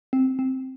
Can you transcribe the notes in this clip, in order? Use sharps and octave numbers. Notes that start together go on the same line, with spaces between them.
C4
C4